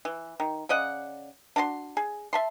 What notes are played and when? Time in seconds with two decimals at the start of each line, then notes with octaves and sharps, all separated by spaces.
0.05 E3
0.40 D#3
0.69 C#3 D5 D#5 F#5
1.56 D4 F#4 A5 C6
1.97 G#4
2.33 E5 A5 C6